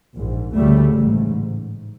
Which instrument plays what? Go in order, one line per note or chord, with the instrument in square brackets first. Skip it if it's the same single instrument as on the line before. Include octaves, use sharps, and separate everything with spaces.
[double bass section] A#1 G#2
D2 C#3 G3 A3
A1 G#2